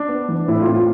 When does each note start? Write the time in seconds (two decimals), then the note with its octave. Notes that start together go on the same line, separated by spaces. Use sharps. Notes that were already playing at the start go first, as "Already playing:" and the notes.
Already playing: D4
0.09 B3
0.29 E3
0.48 A2 E4
0.61 F4
0.68 C4
0.74 F4